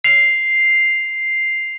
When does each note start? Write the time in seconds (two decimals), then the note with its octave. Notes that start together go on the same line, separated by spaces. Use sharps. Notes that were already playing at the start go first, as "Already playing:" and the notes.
0.04 C7 F7